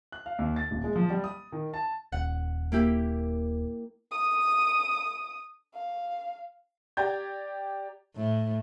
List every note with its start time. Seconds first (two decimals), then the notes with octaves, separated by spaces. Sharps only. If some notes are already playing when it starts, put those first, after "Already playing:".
0.12 F#6
0.26 F5
0.39 D#2
0.56 A6
0.71 D#1
0.84 G#3
0.96 F3
1.10 G3
1.24 D#6
1.52 D#3
1.74 A5
2.12 D#1 F#5
2.72 A#3 E4 G4
4.11 D#6
5.74 F5
6.97 G4 D5 A#5 G6 G#6
8.16 A2